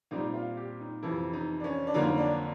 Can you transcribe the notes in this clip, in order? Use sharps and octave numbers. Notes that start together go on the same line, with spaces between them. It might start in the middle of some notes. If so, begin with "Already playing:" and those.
A#2 G3 C4 D#4
F4
G4
D#4
F2 C3 E3 E4
D#4
D4
C#4
D4
F2 D3 F#3 A#3 D#4
D4